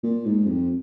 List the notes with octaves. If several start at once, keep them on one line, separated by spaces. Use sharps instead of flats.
A#2
G#2
F2